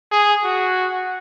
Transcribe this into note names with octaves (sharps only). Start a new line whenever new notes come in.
G#4
F#4